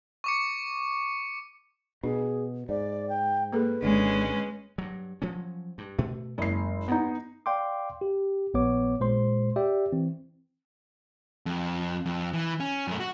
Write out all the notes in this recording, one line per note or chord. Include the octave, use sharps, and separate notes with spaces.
C#6 D6 C#7
B2 D4 G#4
G#2 D5
G5
A#3 G#4 A4 B4
G#1 D3 G#3 C#4
G2 F#3
F3 F#3 C#4
G2
B2 A3
F#1 G#3 C#4 C7
G2 B3 D#4
D5 F5 G5 C6 D6
G4
A#1 B3 C#5 D6
A#2 G#3 C5 C6
G4 D5 E5 G5
E3 C4
F2
F2
E3
C#4
F#2 A3
F#4